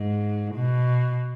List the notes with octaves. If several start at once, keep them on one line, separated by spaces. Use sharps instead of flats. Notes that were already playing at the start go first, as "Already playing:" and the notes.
Already playing: G#2
B2